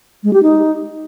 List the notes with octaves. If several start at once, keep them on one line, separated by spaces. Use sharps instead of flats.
G#3
G4
D#4